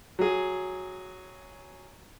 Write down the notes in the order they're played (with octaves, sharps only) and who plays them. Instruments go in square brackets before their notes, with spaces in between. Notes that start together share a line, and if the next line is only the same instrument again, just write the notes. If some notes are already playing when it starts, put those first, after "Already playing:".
[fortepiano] F#3 G#4